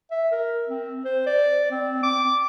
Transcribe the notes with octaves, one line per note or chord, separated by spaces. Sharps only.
E5
A#4
C4
C5
D5
C4
D6